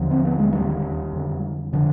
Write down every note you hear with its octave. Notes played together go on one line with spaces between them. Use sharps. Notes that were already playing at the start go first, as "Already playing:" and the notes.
Already playing: D#2 D3 F3
C4
B3
G#3
D#3 G3
F2 D3
D3 F3